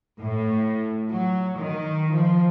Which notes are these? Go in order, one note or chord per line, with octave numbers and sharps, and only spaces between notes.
A2
F#3
D#3
F3